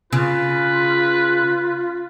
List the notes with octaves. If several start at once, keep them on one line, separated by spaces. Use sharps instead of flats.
C#3 F4 B4